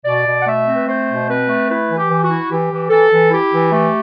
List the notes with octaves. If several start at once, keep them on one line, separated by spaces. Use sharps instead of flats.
B2 D5
B2
F#5
A3 E5
C4
B4
A3 C5
B2
C4 B4
A3
E4 B4
E3
G4
E3
F#4
E4
E3 G4
E3
E3 A4
E3
E4 G4
E3
A3 G4